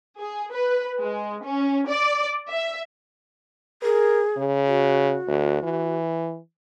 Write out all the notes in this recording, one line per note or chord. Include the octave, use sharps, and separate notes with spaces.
G#4
B4
G#3
C#4
D5
E5
G#4 A#4
C#3
F#4
D2
E3